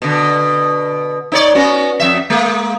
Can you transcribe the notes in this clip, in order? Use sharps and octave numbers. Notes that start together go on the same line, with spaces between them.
B2 D3
D#4 C#5 D5
B3 C#4 F#4
F2 E5
G#3 A#3